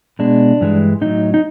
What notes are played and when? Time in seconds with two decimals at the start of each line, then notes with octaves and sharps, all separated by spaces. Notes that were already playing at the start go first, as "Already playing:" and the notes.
0.19 B2 G#3 D4
0.61 G2 E3 G#3
1.01 A2 F#3 D#4
1.34 D#4